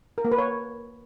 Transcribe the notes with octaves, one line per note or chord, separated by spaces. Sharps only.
A#4
A#3
B4
C#5